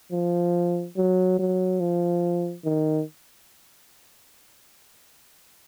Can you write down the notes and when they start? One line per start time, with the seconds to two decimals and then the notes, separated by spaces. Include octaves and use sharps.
0.12 F3
0.97 F#3
1.39 F#3
1.80 F3
2.65 D#3